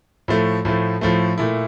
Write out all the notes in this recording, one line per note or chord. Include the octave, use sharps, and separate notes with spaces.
A2 F3 A3
A2 F3 A3
A2 F3 A3
A#2 A3 E4